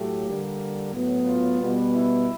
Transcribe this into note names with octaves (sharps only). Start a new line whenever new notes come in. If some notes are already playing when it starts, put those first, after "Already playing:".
Already playing: A2 F#3 A3 G4
D3 G3 A#3
A2 F#3 B3
F4
B2 G3 B3
E4